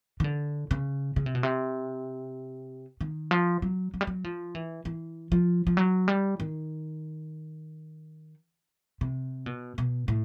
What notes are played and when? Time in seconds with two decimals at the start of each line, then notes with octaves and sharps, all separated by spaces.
0.20 D#3
0.24 D3
0.71 C#3
1.16 C#3
1.26 C3
1.35 B2
1.43 C3
3.01 D#3
3.31 F3
3.62 F#3
3.94 F#3
4.01 G3
4.07 F#3
4.24 F3
4.55 E3
4.85 E3
5.32 F3
5.67 F3
5.77 F#3
6.08 G3
6.40 D#3
9.01 C3
9.46 B2
9.78 B2
10.08 A2